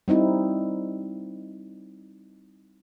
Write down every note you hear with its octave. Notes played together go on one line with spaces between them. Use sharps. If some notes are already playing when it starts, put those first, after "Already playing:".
G3 C4 D#4 E4